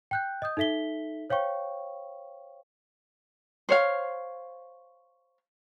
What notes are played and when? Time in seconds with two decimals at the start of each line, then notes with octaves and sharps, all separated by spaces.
0.11 G5 F#6 G6
0.42 D#5 D#6 G6
0.57 D#4 A4 E5 B6 G7
1.30 C5 C#5 F5 G5 C#6
3.69 C5 C#5 F5